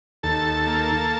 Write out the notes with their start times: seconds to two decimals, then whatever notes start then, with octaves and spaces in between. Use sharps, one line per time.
0.23 D#2 A4 A5
0.67 A#3